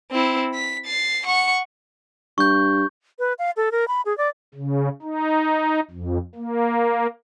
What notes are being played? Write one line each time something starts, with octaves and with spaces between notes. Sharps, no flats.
C4 E4
B6
A6 C7
F#5 C#6
G2 C#6 G6
B4
F5
A4
A#4
B5
G#4
D5
C#3
D#4
F2
A#3